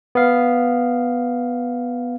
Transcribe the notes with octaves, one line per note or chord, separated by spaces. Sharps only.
B3 F5